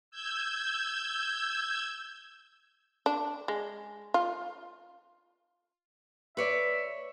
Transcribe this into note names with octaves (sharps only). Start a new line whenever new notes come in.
E6 G6 G#6
D4
G#3
F4
B4 C#5 D5 E5